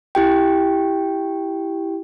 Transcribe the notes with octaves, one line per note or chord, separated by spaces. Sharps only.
E4 G4 G5